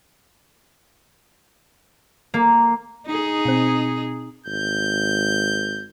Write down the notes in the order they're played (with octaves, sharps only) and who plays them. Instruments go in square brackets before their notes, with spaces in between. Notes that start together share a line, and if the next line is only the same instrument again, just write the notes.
[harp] A#3
[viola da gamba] D#4 G#4
[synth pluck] B2 C4
[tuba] G#1 [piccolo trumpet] G6